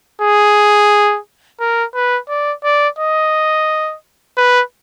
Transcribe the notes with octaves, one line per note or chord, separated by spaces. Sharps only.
G#4
A#4
B4
D5
D5
D#5
B4